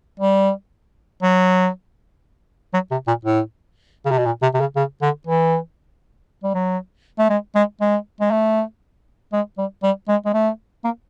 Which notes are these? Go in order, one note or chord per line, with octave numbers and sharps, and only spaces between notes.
G3
F#3
F#3
C3
A#2
A2
C#3
C3
B2
A#2
C3
C3
C#3
C#3
D3
E3
G3
F#3
A3
G#3
G#3
G#3
G#3
A3
G#3
G3
G3
G#3
G#3
A3
A#3